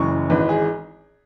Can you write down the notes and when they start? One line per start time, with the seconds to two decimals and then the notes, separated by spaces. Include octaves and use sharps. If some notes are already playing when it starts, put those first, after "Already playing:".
Already playing: F#1 F#2 E3 C#6
0.30 G#1 G#2 E3 B4
0.49 G#4